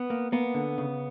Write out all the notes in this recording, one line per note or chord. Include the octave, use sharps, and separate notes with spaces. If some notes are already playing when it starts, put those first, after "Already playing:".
Already playing: B3
A#3
A#3 B3
D3
C#3